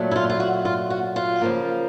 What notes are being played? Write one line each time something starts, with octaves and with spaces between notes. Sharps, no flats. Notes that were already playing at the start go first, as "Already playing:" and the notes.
Already playing: A#2 F#3 A3
E4
F4
F4
F#4
F4
F#4
F4
C#3 F3 A#3